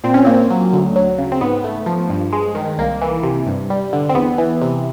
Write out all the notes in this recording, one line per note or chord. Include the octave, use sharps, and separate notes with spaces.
A#2 C4
C#4
A#3 C4
F#3
D2
F#3
C#3
C4
G#2 B3
A3
F3
G2
G#3
D#3
C2 A#3
E3
C3
G2
G3
D3
C4
E2 B3
E3
C3